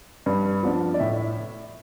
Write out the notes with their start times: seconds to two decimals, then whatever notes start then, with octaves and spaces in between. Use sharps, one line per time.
0.26 G2
0.63 F3 B3 D4
0.94 D5
0.99 A2 E5